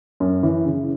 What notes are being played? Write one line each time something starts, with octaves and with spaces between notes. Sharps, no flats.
F#2
E3
C#3